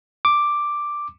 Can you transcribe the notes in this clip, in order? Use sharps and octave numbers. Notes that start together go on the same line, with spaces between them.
D6